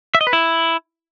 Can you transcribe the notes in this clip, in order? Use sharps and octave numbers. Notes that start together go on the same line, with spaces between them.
E5
D#5
B4
E4